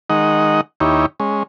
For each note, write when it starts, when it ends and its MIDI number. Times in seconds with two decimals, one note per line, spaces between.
0.10 0.61 51
0.10 0.61 56
0.10 0.61 63
0.10 0.61 75
0.10 0.61 78
0.80 1.06 39
0.80 1.06 63
0.80 1.06 64
0.80 1.06 67
0.80 1.06 73
1.20 1.43 56
1.20 1.43 61